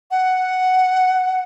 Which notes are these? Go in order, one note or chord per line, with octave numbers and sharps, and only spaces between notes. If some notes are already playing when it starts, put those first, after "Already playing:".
F#5